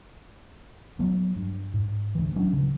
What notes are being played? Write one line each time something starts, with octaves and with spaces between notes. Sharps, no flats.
F3 F#3 A3 B3
G2
G#2
D2 E3
D1 F#3 C#4 D4
C#3 F3